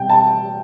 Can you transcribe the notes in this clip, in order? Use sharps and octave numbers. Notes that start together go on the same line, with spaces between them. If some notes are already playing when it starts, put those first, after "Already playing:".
Already playing: B2 G3 C4 G5
A5